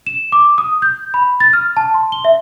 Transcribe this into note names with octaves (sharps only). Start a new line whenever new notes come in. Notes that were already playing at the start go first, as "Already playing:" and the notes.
E7
D6
D#6
G6
B5
A6
F6
A5
C6
G7
E5